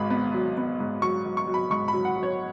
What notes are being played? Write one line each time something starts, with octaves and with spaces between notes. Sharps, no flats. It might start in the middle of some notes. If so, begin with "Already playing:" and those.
Already playing: G#1 G#2 B5
B3
F#3
B3
G#2
F#3 C#6
F#3
C#6
F#3
B5
G#2 C#6
B5
F#3
F#5
F#3
C#5